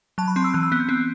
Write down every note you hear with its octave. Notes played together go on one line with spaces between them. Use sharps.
F#3 A5
B5
C4 C6
E6
E3 F#6
E6
B3 F#6
G6
C4 F#6